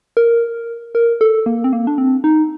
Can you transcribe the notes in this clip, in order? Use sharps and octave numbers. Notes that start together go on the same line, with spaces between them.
A#4
A#4
A4
A#3
C4
A#3
D4
C4
D#4